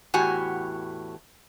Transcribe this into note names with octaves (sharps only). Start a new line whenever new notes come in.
E2 A2 F#4 G4 G#5